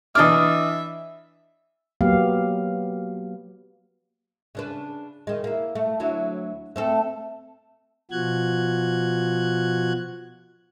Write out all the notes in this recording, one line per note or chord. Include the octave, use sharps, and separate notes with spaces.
E3 D4 D#5 E5 D6 F6
F#3 A#3 B3 G4 F5
C#3 D4 B4
D#3 G#3
A#3 E4
A3
D2 F#3 E4
A3 C4 A4
B2 F3 F#4 F#6 G#6